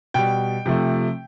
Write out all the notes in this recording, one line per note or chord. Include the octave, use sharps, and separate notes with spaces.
B2 G3 G5
C3 F3 A3